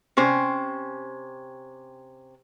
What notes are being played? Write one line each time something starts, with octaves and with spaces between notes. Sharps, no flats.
C3 C#4 C5